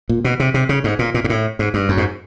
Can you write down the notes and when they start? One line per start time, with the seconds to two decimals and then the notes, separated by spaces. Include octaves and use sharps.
0.09 A#2
0.25 B2
0.40 C3
0.54 C3
0.69 C#3
0.84 G#2
0.99 A#2
1.14 A#2
1.24 G#2
1.30 A2
1.59 G#2
1.74 G2
1.89 F#2
1.97 G#2